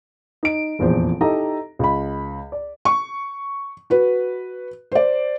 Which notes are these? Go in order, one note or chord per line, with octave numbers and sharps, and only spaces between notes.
D#4 D7
F1 A#1 E2 F3 C5
D#4 E4 G4 A4 D#5 A#5
C#2 B5
D5
C#6
F#4 B4
C5 D5